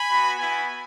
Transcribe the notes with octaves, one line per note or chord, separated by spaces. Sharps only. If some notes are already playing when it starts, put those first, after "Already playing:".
Already playing: G#5 B5
B3 F#4
B3 E4 G#5 B5